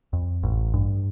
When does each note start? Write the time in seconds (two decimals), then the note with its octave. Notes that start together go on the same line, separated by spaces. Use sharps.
0.13 F2
0.43 A1
0.74 G2